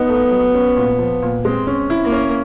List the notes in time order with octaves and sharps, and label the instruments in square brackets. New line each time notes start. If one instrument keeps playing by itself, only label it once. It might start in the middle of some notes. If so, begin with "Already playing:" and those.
Already playing: [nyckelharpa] B3 [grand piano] D#4
[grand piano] A3
F#3
C#4
A#2
F3
A#2
[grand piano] G#3 [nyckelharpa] C4
[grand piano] C#4
E4
[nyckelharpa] A#3
[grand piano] C#4